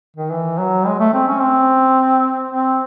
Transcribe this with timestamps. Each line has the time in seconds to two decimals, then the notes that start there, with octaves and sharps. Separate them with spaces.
0.17 D#3
0.31 E3
0.58 F#3
0.86 G#3
0.99 A3
1.13 C4
1.27 C#4
1.40 C4
2.51 C4